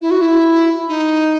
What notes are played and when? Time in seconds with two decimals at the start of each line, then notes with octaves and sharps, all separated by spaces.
0.01 E4
0.10 F#4
0.21 E4
0.88 D#4